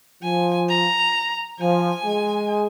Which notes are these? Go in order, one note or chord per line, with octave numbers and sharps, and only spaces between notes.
F3 G#5
A#5
F3 G#5
G#3